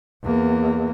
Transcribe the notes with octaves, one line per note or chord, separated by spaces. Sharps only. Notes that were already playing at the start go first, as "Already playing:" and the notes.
E2 A#3